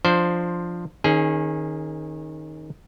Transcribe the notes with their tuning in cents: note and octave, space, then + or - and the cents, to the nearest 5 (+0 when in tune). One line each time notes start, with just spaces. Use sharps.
F3 +0 D4 +15 C5 +5
D#3 +0 C#4 -25 G#4 +5